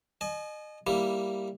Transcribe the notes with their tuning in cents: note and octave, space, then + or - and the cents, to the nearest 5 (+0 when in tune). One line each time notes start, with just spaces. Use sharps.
D#5 -30 G#5 +40
G3 +0 A#3 +0 E4 +0